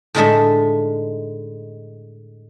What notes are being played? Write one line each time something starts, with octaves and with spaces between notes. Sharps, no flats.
A2 D3 G#3 D#4 A4 E5